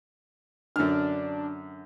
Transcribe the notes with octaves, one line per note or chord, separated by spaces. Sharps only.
F#2 D3 D4 F6